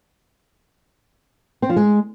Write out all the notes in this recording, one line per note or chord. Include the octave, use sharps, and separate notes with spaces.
C4
F3
G#3